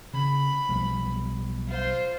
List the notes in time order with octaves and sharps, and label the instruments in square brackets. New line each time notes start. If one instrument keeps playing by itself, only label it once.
[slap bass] C#3 [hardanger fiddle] B5
[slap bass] B1 F3 G3
[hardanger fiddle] F4 C5